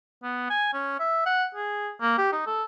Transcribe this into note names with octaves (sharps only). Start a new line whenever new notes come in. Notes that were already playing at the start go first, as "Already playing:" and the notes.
B3
G#5
C#4
E5
F#5
G#4
A#3
G4
D#4
A4